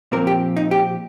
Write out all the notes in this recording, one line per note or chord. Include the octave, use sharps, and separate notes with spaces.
A#2 F3 C4 A#4
G4
D#4
G4